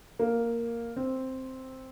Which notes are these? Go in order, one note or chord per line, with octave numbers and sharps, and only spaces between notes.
A#3
C4